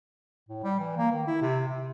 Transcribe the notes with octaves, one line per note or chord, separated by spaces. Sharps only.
A2
G3
E3
A#3
D#3
E4
C3
C3